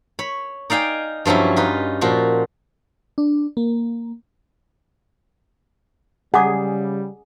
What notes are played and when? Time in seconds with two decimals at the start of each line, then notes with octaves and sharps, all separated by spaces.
0.19 C#5 B5
0.70 D#4 D5 F5 G5 G#5
1.25 G2 F3 F#3 C#4 E4
1.56 D#4 F4 B4
2.01 A#2 F3 F#4
3.18 D4
3.57 A#3
6.34 C#3 G3 G#4 F#5 D6